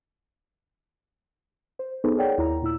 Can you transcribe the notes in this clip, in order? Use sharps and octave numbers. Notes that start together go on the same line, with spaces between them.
C5
B3 D#4 G#4 A4 B4 C5
G#4 A#4 C#5 D5 F#5 G5
D#2 E4 C#5 A#5
A#2 E4 E6